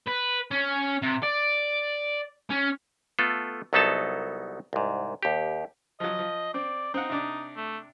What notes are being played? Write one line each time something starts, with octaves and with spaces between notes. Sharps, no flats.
B4
C#4
C3
D5
C#4
A3 B3 F4 A4
C2 F#3 B3 D#4 A4 A5
C2 G#2
D#2 G4
F3 F#3 D#5
F3
C4 D5
C4 D#4 F#5
C3 D4 D5
A3